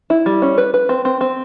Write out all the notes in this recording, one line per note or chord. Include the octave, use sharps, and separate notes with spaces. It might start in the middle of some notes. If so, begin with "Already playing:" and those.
E4
G3
C#4
B4
B4
C4
C4
C4